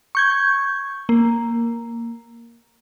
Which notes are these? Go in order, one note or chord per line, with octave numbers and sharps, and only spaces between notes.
C#6 G6 G#6
A#3